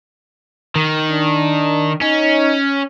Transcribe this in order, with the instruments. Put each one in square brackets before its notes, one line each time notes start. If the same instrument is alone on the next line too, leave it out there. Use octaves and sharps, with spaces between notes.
[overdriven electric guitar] D#3
[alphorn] D4
[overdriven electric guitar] C#4 [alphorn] D#4